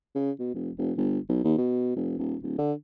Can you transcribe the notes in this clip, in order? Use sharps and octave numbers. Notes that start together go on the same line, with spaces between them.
C#3
B2
F1
F1
G1
B1
D#2
B2
F1
D#1
D1
D3